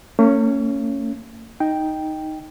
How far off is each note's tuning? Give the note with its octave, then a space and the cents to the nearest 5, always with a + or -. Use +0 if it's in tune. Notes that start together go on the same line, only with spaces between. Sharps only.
A#3 -45 C#4 +0
D#4 +0 G5 +0